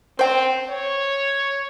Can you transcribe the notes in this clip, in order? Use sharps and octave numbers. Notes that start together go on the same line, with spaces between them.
C4 C5 G5
C#5